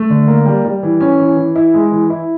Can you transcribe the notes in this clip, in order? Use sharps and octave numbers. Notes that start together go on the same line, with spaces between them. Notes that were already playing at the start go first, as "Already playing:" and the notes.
Already playing: A3
D3
A#3
G3
G3
E3
C#4
E3
E3
E4
G#3
E3
E4